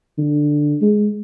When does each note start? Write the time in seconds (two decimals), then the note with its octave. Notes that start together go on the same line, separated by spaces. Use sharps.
0.18 D3
0.81 G#3